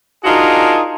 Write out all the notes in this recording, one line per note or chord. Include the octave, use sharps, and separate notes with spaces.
D4 D#4 F4 F#4 G#4 A#4